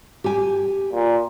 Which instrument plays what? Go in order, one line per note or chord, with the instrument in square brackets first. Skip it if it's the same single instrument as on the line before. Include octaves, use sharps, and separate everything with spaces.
[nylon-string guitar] G4 G#5
[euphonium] A#2